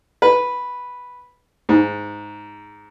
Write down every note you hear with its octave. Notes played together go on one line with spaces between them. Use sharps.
B4
G#2